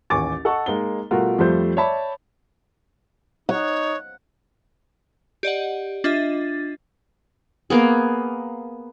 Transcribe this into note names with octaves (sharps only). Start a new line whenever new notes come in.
A1 D#2 G#5 C#6 D6 A6
A4 D#5 F#5 A5 C#6
G#3 A#3 D#4 G7
B2 G3 A3 F4 F#4 A#4
F2 F3 G3 A3 C5 G6
C#5 D5 E5 A5 B5
D#4 C#5 F#5
G4 D5 D#5 F#5
D4 F4 D#5 E5 A6
A#3 B3 G#4